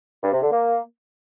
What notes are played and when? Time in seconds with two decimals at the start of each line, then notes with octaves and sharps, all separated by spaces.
0.23 G2
0.32 C3
0.42 D3
0.51 A#3